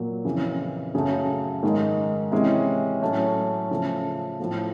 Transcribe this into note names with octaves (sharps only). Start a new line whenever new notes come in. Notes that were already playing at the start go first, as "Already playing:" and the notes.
Already playing: A#2 F#3 A#3
F2 C#3 E3
F#2 C#3 F#3 A3
G#2 D#3 G#3
C3 E3 G#3 C#4 E4
A2 F#3 A3 C#4
C#3 F3 A3
A2 F3 A3